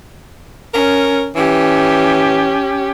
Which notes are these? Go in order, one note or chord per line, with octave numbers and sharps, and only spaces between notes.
C#4 A#4
E3 C#4 G4